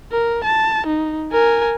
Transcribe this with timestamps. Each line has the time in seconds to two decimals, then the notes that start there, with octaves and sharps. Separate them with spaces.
0.12 A#4
0.45 A5
0.87 D#4
1.32 A#4 G#5